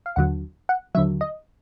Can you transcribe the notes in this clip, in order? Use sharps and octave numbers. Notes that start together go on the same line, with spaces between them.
F5
D#2 D3 F#3 F#5
F#5
D#2 D3 F#3 E5
D#5